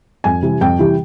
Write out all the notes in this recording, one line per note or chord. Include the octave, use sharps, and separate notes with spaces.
F2 G#5
C3 E3 G3
F2 G5
C3 E3 G3